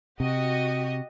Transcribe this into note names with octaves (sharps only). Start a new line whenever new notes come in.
C3 F#4 G4 D#5